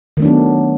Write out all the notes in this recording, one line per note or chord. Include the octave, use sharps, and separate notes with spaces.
D#3 F#3 A3 B3 D4